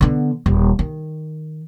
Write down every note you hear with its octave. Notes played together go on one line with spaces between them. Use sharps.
D3 B3
D#1
D#3